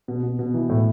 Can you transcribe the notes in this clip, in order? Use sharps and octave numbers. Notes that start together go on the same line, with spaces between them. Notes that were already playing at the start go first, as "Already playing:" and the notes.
B2
B2
B2
E3
A2